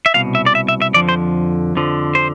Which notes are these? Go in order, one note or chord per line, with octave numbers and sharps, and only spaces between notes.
E5
C2 B2 F5
E5
D5
E5
E5
E5
F2 D3 F3 D5
C5
F2 D3 F3
C5